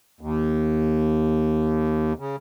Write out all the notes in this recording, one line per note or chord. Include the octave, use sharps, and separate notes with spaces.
D#2
C#3